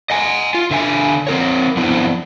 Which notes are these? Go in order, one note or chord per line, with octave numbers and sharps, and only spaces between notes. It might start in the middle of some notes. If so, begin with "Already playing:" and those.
D#5 F#5 G#5
F4
D3 E5 G#5
C4 A#4 C#5
F3 B3 C4 D4 E4